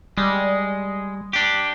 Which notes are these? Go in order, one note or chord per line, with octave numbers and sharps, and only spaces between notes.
G3 G#3
D4 G4